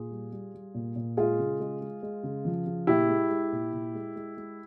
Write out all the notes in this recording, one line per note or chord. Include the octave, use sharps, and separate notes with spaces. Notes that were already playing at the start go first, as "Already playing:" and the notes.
Already playing: A#2 F4 G#4
G3
G3
G3
A#2
A#2
G#3 F4 G#4
C#3
G#3
G#3
G#3
C#3
F3
C#3
A#2 E4 G4
G#3
G#3
A#2
A#2
G#3
G#3
G#3